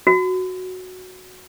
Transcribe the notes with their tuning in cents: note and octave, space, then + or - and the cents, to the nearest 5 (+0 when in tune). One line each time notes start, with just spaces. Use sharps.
F#4 -5